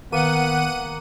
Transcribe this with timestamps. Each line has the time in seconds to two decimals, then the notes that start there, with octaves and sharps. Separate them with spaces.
0.12 D#3 A#3 B3 F#5 D#7